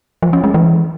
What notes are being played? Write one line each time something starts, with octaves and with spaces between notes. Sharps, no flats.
F3
C#4
G#3
E3